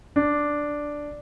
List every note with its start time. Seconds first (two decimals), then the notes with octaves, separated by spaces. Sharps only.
0.16 D4